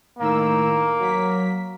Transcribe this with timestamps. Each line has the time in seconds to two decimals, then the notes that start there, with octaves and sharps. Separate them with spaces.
0.19 A2 D#3 A#3 E6
0.99 F#3 B6